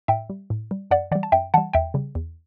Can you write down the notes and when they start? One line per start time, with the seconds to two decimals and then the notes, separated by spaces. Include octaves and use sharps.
0.08 A2 E5 G5
0.29 G3
0.50 A2
0.71 G3
0.91 F#2 D5 F#5
1.11 E3 G3 D5 F#5
1.23 A5
1.32 F#2 E5 G5
1.54 E3 G3 F#5 A5
1.73 E2 E5 G5
1.94 C#3 G3
2.15 E2